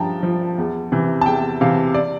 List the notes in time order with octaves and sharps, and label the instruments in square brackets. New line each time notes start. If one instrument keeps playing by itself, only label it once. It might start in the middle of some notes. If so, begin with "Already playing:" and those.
Already playing: [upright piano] G2 F3 G5 A5 A#5
F3
E2
C3 E3
A5
E2 G5
C3 E3 F5
D5